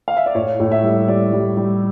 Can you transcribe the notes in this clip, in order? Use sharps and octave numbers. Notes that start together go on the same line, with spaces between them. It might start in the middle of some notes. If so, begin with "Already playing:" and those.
F5
E5
D5
A2 C#5
A2
E5
G3
G3 D5
G3
G3